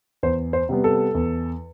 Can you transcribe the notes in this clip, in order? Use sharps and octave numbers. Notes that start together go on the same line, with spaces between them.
E2 C5
C5
C3 G3 B3
A4
E2